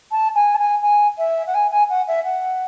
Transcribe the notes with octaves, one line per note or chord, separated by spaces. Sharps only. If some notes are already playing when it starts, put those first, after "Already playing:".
A5
G#5
A5
G#5
G#5
E5
F#5
G#5
G#5
F#5
E5
F#5